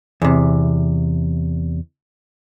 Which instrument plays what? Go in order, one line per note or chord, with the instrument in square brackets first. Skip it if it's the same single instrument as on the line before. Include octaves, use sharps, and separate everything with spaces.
[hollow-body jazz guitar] E2 C3